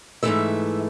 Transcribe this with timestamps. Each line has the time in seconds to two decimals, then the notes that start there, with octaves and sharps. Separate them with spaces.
0.23 G#2 E3 A3 E5